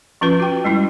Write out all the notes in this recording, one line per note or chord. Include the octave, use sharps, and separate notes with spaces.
F3 C#4 F4 B4
F#4 G5
G3 G#3 E4